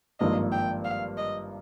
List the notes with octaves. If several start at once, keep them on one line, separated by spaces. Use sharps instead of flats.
G#1 G2 F3 A#3 D#5
G5
F5
D#5